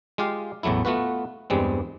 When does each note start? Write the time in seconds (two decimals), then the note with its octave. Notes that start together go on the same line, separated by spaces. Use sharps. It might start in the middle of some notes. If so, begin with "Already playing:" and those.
0.18 G#3 F4 G4 F5
0.63 A1 E2 F#3 A3 E4
0.85 A3 B3 F4 F#4 B4
1.50 E2 G2 G3 G#3 C4